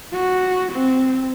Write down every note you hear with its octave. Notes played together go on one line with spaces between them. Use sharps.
F#4
C4